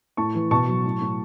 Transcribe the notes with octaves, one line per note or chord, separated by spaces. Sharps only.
A2 A5 C#6
E3
B2 A5 C#6
F#3
A2
A2